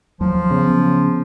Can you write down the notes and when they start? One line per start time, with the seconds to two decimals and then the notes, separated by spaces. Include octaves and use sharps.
0.20 D#2 F3 F#3
0.51 C#3 B3